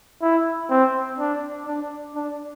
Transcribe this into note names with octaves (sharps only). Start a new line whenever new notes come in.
E4
C4
D4
D4
D4